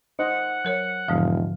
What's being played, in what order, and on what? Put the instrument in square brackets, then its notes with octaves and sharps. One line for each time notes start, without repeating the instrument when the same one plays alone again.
[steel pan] D#4 C5 D#5 [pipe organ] F#5
[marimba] F#3 A#4 C#5
[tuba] E1 [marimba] G#2 D3 F3 [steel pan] F5